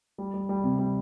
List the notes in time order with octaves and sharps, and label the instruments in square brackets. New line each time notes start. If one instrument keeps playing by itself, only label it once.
[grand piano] G3
G3
G3
C3
G3